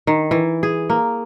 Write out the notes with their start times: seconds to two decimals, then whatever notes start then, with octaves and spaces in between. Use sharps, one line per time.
0.07 D#3
0.31 E3
0.63 G#4
0.90 A#3